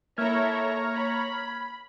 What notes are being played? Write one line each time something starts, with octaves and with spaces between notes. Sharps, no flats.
A#3 E4 A4 C#5 E5 A#5 F6 G#6
B5